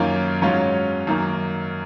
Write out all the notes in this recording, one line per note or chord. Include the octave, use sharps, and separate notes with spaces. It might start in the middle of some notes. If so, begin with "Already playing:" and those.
Already playing: F#2 D#3 A#3 C#4 F4
G#2 F#3 C#4 F4
F#2 D#3 A#3